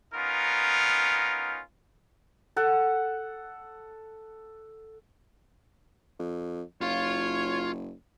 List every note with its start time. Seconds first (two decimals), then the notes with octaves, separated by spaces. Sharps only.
0.14 B3 C#4 D#4 F4 A#4
2.56 A4 F#5
6.19 F2
6.81 F#1 F4 C#5 F5